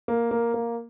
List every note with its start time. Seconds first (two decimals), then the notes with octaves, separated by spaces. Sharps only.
0.08 A#3
0.31 A#3
0.54 A#3